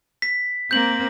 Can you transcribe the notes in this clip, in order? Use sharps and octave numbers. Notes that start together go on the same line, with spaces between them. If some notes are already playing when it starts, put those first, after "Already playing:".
B6
A#3 C4 G6 F#7